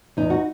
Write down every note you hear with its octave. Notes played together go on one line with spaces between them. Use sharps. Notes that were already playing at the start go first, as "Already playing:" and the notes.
E2 D#4
F#4